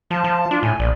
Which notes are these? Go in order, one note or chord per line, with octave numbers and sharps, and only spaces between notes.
F3 A5
F3
D4 F4
A2 G#5
A#1 D5